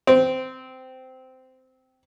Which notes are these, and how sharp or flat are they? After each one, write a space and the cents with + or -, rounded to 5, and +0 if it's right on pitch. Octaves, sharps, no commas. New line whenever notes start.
C4 -15